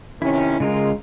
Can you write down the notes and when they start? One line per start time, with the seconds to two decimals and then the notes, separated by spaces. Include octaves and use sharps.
0.22 C3 D#3 C#4 E4
0.60 C#3 G#3 F4 A#4